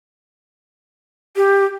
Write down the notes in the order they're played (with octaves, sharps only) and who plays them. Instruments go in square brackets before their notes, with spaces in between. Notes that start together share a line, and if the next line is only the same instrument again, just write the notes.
[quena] G4